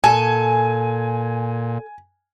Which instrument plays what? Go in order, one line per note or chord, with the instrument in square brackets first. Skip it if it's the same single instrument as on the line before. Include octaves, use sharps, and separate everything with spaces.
[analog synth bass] A#2 [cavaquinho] A4 [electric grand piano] G#5